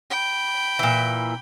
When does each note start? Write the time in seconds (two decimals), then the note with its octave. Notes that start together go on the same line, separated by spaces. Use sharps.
0.10 G5 B5
0.79 A#2 E3